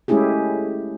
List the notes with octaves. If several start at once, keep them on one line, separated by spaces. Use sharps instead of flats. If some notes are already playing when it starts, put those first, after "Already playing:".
G#3 A3 C#4 E4 G4 G#4